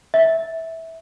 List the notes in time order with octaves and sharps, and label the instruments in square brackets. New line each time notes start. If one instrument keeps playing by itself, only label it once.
[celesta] E5